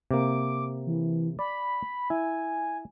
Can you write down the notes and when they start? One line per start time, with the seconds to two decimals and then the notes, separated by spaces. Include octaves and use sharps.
0.11 C3 A#3 D6
0.86 E3
1.39 D5 B5
2.10 E4 G#5